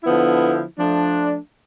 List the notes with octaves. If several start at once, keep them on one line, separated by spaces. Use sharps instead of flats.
D3 F3 B3 E4
F3 A3 D4